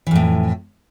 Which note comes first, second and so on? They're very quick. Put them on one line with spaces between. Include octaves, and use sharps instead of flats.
E3 F2 A2